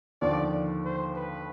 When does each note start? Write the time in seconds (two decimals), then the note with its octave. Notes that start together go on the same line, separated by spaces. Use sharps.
0.22 D#2 D3 F3 D5
0.85 C5
1.16 B4